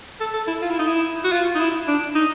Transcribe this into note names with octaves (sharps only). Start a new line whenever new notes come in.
A4
A4
E4
F4
E4
D#4
E4
F#4
F4
D#4
E4
D4
D#4